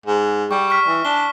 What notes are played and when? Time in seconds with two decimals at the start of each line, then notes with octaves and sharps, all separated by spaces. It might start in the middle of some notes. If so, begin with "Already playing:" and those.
0.06 G#2
0.51 G3 C#6
0.70 C#6 F6 B6
0.87 E3
1.05 D4 G7